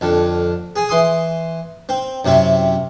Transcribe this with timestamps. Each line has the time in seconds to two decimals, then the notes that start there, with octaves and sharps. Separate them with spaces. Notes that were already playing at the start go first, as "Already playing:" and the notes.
0.01 F2 D3
0.76 G#4 G#5
0.89 E3 C6 D#6
1.89 C4
2.25 F#2 C3 C4 E4